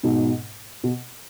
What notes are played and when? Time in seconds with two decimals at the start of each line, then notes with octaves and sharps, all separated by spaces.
0.03 G#2 B2
0.84 B2